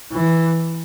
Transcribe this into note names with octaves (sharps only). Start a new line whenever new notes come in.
E3